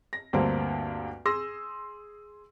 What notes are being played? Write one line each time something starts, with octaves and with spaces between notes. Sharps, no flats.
A#6
D2 G2 A#3 C4
G#4 C6 E6 A#6